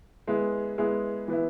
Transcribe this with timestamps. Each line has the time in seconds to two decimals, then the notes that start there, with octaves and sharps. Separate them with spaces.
0.27 G#3 B3 E4 G#4
0.78 G#3 B3 E4 G#4
1.28 E3 B3 E4